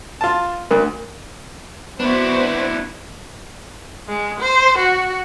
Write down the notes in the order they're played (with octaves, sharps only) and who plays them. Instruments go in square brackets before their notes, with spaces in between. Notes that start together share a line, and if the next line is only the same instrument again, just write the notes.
[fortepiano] F4 A5
[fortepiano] D2 [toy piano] A#4
[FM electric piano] B3 [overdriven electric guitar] D4 E4 [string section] F#4 B4 [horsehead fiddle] C5
[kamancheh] G#3
C5
F#4